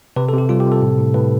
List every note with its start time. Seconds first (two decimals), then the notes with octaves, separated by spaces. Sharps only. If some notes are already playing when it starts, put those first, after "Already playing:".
0.16 C3 B4
0.29 A4
0.33 C3
0.38 G4
0.49 G3 F4
0.60 G4
0.67 C3
0.72 A4
0.82 A2
0.99 A2
1.14 A2 B4